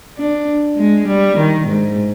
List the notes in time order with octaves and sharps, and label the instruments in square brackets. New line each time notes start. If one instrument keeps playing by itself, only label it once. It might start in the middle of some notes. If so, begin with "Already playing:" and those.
[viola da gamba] D4
G#3
G3
D#3
G#2